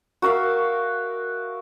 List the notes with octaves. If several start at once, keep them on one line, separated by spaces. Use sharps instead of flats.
F#4 A#4 E5 F5